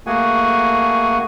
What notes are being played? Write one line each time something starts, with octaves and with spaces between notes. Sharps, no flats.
A3 A#3 F#4 G#4 F#5 G#5